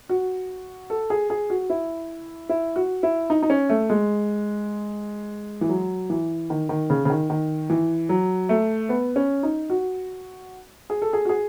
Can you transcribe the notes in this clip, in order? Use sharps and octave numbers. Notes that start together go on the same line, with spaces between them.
F#4
A4
G#4
G#4
F#4
E4
E4
F#4
E4
D#4
D#4
C#4
A3
G#3
E3
F#3
E3
D#3
D#3
C#3
C#3
D#3
D#3
E3
F#3
A3
B3
C#4
D#4
F#4
G#4
A4
G#4
F#4
G#4